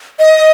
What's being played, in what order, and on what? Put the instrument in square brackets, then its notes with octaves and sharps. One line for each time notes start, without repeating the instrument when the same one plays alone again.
[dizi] D#5